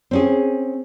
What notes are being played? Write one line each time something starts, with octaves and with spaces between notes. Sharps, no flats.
C4 C#4 G#4